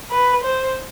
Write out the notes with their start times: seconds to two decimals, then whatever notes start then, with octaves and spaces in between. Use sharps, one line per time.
0.11 B4
0.43 C5